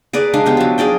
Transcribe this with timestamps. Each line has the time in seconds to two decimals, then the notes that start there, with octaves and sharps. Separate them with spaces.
0.13 G#4 A#4 B4 D5
0.33 G#3 D4 F5
0.46 B3 G4 F5
0.57 F3 F#3
0.78 G#4 A#4 D5 G5